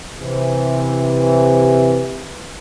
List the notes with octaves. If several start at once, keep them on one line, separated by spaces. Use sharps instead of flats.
C3 E3